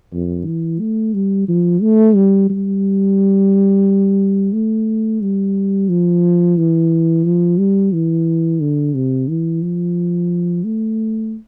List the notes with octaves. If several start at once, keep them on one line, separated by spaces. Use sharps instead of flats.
F2
E3
A3
G3
F3
A3
G3
G3
A3
G3
F3
E3
F3
G3
E3
D3
C3
E3
F3
A3